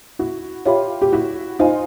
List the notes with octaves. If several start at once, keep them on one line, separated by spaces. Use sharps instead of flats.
E4 F#4
F4 G4 C#5 E5 G5 B5
G4
E4 F#4
D#4 F4 C5 D#5 G#5 C6